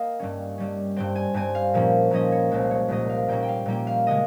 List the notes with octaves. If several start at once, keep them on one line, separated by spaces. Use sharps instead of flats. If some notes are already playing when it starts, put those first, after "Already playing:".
Already playing: A#3 D#5 F5 G5
G2 G3 C#4
G2 G3 C#4
G2 G3 C4 G5
G#5
G2 G3 C4 G#5
F5
A#2 F3 A#3 C#4
A#2 F3 A#3 C#4 D#5
C#5
C2 A#2 F3 G#3 C5
C#5
C2 A#2 F3 G#3 D#5
F5
A#2 G3 A#3 C#4 G5
G5
F5
A#2 G3 A#3 C#4 G5
F5
C#3 G#3 D#5